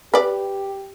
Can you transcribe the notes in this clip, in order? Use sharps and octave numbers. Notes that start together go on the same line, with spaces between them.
G4 B4 D5